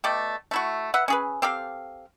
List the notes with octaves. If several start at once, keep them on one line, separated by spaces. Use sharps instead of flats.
B2 A3 D5 G5
A3 E4 F#4
B4 E5 F#5
C#4 G#4 B4
C4 G4 A4 F5